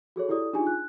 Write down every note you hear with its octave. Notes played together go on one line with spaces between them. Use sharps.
F#4 G#4 A4 C#5
E4 G4 A4 D5 D#6
D4 D#4 F4 G4 G#4 G#5
F#6